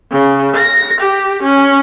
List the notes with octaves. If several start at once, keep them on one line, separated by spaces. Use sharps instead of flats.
C#3
A#6
G4
C#4